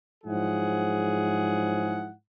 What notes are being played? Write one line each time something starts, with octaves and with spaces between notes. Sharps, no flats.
G#2 F3 F#3 E4 G#4 F#5